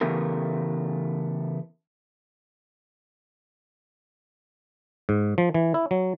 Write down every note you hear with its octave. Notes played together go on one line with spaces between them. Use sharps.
C#3 E3 A3 B3 G4 A#4
G#2
F3
E3
E4
F#3